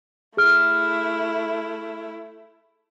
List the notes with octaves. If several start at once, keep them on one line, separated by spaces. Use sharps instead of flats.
A3 E4 G#4 F6